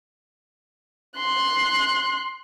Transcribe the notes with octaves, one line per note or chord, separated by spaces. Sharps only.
C6 F#6